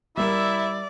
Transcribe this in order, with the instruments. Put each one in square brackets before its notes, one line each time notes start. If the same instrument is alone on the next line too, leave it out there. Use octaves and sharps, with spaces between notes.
[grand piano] G3 A#4 [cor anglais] E4 [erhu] D5 [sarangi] E5